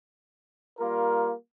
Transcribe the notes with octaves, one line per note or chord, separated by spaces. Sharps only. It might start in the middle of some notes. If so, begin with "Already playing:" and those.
G3 A#3 F4 A#4